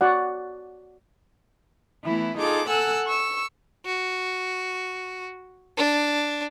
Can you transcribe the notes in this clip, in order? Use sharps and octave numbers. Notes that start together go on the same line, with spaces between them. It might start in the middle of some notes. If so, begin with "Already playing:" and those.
F#4 D5 F#5
E3 A3 B3 E4
D#4 F4 G#4 A4 D6
A4 F#5 G#5 E6 F#6
C#6 E6
F#4
D4